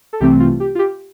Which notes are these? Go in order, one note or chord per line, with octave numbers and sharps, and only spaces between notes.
A4
C2 C3 E3 A3 C4 G4
F4
G4
F4
G4